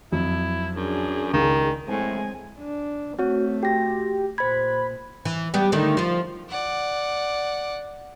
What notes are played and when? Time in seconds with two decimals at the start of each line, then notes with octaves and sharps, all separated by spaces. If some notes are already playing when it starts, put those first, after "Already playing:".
0.12 F2 F#3 E4
0.76 F#2 D4 G#4
1.33 C#2 D#3
1.88 A2 G#3 C4 G#5
2.59 D4
3.19 A3 C4 F#4 C#5
3.63 F#4 G4 A#6
4.38 A#2 C5 B5 G#6
5.25 E3
5.54 G3 B3 G4
5.72 D3 D#3 A3
5.97 F3 F4
6.49 D5 F#5